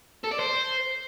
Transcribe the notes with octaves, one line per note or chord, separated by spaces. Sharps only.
A4
D5
C5